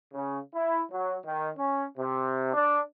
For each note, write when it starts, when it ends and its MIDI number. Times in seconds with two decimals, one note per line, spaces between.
0.13 0.38 49
0.54 0.81 64
0.92 1.16 54
1.24 1.49 51
1.57 1.84 61
1.96 2.51 48
2.53 2.80 62